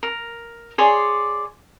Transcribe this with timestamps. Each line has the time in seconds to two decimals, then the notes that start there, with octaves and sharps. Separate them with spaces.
0.03 A#4
0.78 G#4 C#5 D5 C6